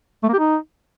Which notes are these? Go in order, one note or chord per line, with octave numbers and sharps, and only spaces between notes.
A3
A#3
G4
D#4